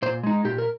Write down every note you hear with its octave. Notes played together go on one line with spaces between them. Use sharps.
A#2 C5
G#3 D#4
A#2 G4
A#4